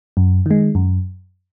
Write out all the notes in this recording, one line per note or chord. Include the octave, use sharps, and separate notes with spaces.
F#2
D#3 G#3
F#2